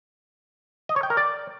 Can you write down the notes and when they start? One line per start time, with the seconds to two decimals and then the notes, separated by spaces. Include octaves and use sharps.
0.89 D#5
0.96 C#5
1.03 G5
1.10 A#4
1.17 D5